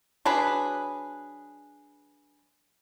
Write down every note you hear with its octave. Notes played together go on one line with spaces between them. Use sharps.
F#3 D4 G#4 B4